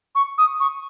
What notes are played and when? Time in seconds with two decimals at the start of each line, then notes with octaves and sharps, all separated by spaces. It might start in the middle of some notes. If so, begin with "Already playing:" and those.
0.15 C#6
0.38 D#6
0.60 C#6